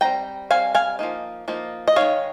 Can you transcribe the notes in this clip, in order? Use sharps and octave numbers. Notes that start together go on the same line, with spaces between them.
G3 C4 D#4 G5 A#5
G3 C4 F5 G#5
F5 G#5
F3 A#3 D#4
F3 A#3 D#4
D#5
D#3 G#3 D#4 C#5 F5